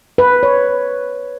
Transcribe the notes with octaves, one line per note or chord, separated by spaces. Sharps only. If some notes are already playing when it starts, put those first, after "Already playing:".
B4
C#5